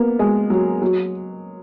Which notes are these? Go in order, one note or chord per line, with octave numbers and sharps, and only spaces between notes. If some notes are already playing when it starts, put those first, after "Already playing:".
Already playing: A#3 B3
G#3
F#3
F#3